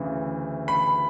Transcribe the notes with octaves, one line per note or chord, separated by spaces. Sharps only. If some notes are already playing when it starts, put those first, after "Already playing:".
Already playing: D2 C#3 E3
B5